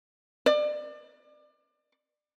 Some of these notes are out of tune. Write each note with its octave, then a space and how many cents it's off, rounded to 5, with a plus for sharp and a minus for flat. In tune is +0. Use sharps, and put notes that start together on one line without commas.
D5 +30